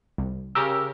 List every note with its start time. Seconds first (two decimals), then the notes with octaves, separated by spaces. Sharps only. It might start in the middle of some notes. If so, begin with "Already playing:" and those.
0.18 C2
0.55 C#3 G4 A#4 E6